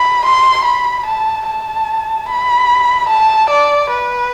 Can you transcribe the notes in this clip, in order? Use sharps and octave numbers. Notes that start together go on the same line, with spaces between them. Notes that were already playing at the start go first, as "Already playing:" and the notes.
Already playing: B5
C6
B5
A5
A5
B5
A5
D5
B4